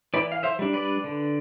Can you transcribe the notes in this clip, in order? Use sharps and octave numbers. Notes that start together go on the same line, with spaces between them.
E3 B4 D5
F5
C5 E5
G3 D4
B4 D5
D3